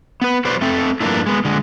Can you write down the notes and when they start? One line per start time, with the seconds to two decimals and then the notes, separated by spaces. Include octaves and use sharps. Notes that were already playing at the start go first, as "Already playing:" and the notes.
0.21 B3 B4
0.45 F#3 B4 C5 D5
0.61 A3 C4 A4
1.00 G2 F3 A3 A#3 D4 E4
1.26 G#3 B3
1.45 D3 G#3